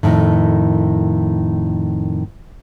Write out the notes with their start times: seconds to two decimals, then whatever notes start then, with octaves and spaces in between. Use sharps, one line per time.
0.03 F2 A2 D#3